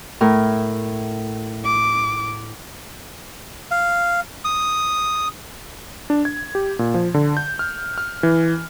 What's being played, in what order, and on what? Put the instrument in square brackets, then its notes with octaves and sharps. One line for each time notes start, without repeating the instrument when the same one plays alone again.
[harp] A2 A#4
[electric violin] D6
[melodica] F5
D#6
[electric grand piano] D4
G#6
G4
A#2
F3
D3
G6
F6
F6
E3